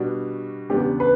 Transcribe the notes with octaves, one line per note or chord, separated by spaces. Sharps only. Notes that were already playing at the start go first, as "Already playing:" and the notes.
Already playing: B2 G3 D4 F#4
E2 C#3 G3 B3 D4 G4
B4